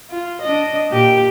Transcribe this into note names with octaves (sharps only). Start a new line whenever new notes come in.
F4
D4 D#5
A#2 G4